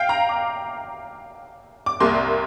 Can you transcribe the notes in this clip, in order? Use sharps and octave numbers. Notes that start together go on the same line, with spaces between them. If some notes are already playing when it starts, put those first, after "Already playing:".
Already playing: F5 G5
A#5
D6
D6
C2 C3 G3 A#3 C6